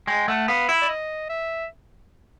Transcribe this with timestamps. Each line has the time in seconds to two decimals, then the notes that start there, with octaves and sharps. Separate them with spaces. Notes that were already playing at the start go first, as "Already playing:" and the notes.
0.07 G#3 G5
0.28 A3 F#5
0.48 B3 F5
0.69 E4 E5
0.82 D5
0.88 D#5
1.30 E5